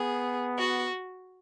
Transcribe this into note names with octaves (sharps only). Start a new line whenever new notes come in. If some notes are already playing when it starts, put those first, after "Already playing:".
Already playing: B3 G#4
F#4